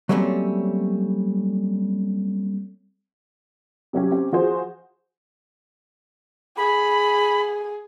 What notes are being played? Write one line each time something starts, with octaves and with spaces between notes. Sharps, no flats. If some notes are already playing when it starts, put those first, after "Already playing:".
F#3 G3 A3 A#3 C4 C#4
C3 F#3 C#4 G4
C4 C#4 G4
F3 F#4 G#4 C5
G#4 B5